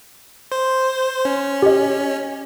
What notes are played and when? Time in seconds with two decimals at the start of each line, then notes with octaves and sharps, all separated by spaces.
0.52 C5
1.25 C#4
1.62 G4 D#5